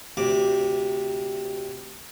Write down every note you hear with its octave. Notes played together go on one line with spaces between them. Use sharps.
D2 C3 D6